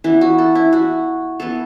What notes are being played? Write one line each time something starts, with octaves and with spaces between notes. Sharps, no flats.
E3 B3 E4
F#4
A4
E4
F#4
E3 B3 A4